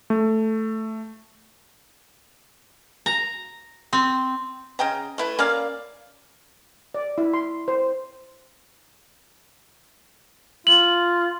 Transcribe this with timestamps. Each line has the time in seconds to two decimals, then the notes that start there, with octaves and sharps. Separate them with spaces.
0.10 A3
3.06 A#5
3.93 C4
4.79 C#3 D#5 G5 A#5
5.18 A3 E4 B4
5.39 A#3 C#4 D5 F5
6.95 D5
7.18 E4
7.34 C6
7.68 C5
10.67 F4 F#7